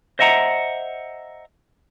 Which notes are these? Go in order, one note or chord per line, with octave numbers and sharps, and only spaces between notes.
C5 D#5 E5 F#5 A#5